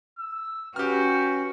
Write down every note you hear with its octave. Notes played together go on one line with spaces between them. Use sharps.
E6
C#4 F#4 G4 B4 G5 F6